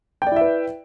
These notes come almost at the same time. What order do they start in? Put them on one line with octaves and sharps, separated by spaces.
G5 D5 E4 E5 B4